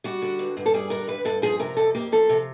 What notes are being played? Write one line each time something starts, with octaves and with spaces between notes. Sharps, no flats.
G3 F#4
D3
G2
G2
A4
G3 G#4
D3 A#4
G2 B4
G2 A4
F3 G#4
C3 A#4
F2 A4
A#3 G4
F3 A4
C3